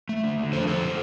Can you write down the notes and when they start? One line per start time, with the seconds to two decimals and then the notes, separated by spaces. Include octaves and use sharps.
0.09 A3
0.23 D3
0.38 D3
0.52 F3 A4 C5
0.67 A3 A4 C5
0.82 D3